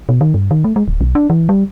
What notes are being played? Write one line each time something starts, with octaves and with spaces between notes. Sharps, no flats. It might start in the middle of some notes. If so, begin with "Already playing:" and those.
B2
D#3
G2
D#3
A3
G#3
D1
B1
D4
E3
G3